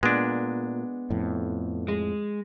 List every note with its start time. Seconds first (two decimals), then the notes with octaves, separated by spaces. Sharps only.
0.03 A#2 G#3 B3 D4
1.10 F2 A2
1.88 G#3